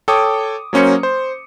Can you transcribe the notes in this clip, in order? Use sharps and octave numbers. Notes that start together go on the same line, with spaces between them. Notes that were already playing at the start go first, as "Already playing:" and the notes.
A4 C#5 G5 D6 D#6
F#3 A#3 C#4 C5 C#7
C5